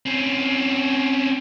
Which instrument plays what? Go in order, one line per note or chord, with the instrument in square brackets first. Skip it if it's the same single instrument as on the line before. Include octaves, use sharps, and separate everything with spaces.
[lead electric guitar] C4 C#4